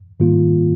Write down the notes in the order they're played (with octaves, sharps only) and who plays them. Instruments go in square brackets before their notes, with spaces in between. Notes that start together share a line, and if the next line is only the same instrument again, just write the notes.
[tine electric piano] G#2 D#3 G3 A#3 F4